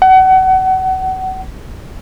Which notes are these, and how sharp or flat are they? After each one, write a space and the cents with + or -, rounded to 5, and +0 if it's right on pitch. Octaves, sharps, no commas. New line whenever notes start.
F#5 +30